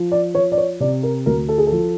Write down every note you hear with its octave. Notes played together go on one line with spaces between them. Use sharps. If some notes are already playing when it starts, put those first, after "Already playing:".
Already playing: F3
D5
F3 C#5
D5
C#5
C3 D5
A#4
D2 A#4
A4
G#4
F3 A4